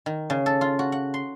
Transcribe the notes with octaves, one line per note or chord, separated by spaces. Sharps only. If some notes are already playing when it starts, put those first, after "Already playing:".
D#3
C#3
A4
F4
F#4
F#5
C6